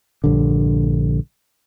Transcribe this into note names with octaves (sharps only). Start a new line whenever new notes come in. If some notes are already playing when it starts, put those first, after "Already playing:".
A#1 G2 D3